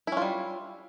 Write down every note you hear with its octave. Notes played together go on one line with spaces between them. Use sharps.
G3 C#4 E4 F4